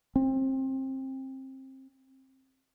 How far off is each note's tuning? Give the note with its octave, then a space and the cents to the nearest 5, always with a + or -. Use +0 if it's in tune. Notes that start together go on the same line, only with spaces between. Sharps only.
C4 +25